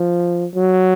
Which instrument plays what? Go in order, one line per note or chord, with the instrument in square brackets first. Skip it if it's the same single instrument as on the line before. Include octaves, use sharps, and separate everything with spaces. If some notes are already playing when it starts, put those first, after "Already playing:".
Already playing: [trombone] F3
F#3